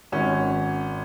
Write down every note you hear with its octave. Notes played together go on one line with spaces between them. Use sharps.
G#1 C#4